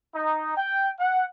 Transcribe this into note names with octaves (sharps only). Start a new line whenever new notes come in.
D#4
G5
F#5